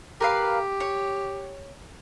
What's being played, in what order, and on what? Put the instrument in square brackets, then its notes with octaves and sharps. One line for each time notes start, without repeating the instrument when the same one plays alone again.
[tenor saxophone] G4 [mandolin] A#4 B4 F5
[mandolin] C#5